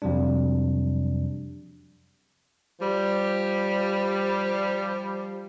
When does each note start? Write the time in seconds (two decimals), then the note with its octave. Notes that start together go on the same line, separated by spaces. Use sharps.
0.02 F2 C3 F#3 G3 D4
2.80 F3 G3